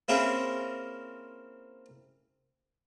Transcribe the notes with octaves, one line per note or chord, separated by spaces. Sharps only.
A#3 C4 C#4 E4 G#4 A#4